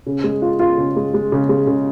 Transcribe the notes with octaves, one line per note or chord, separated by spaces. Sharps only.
C#3
G#3
F4
F4
C#3
G#3
G#3
C#3
G#3
C#3